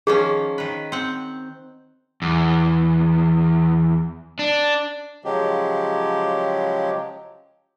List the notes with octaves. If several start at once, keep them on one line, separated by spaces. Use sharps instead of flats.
D#3 F3 C#4 G#4
D#3 B4
C4 F#5
E2
D4
C#3 F3 F#3 G#3 G4